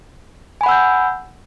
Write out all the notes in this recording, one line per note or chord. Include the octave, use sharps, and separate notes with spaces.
F#5 G#5 B5 E6 G6